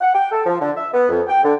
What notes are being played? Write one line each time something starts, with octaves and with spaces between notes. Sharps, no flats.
F#5
G5
A4
F3
D3
E5
B3
F2
G5
D3